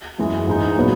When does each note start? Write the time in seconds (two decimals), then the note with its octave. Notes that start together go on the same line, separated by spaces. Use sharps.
0.18 F#2 E3 G#3
0.47 G#2 E3 G#3 D#4
0.76 A#2 F#3 B3